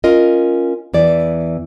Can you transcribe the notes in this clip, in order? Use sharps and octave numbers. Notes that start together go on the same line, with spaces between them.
C#4 F4 A#4 D#5
E2 E3 D5